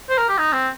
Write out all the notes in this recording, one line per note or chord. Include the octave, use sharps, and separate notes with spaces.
C5
A#4
G4
D#4
C4